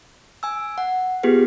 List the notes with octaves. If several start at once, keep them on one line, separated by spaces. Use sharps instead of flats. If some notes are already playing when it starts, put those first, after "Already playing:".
G#5 E6
F#5
B3 F4 G4 G#4 B4